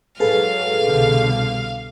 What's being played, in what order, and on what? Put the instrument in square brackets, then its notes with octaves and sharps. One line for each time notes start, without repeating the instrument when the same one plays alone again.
[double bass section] G#2 F#3 [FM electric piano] G#4 A4 B4 [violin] F5
[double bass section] C2 B2 D3